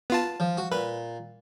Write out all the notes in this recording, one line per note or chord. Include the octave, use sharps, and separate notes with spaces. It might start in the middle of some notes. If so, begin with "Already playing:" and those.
B3 F4 A5
F3
F#4
A#2 B4